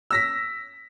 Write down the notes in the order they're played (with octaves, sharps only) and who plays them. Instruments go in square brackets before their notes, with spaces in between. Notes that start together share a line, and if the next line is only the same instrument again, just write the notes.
[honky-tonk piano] E6 A#6 B6